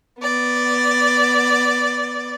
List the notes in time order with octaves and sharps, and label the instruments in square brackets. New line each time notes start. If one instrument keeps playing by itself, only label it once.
[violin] B3 D5